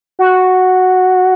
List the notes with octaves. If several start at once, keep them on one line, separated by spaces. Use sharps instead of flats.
F#4